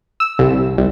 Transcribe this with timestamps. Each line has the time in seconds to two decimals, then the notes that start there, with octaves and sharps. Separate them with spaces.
0.20 E6
0.39 C2
0.78 C2